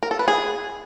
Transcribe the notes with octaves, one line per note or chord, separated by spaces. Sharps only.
A#4
A4
B4
G#4